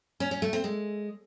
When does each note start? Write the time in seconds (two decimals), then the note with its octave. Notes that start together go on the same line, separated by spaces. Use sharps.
0.20 C#4
0.31 C#4
0.42 A3
0.53 C4
0.64 G#3